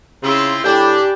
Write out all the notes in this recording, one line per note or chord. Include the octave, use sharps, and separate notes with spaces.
C#3 C4 E4 F4
A2 D4 G4 G5 G#5 B5